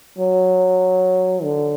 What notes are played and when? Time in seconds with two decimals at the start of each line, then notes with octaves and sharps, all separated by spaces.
0.18 F#3
1.43 D3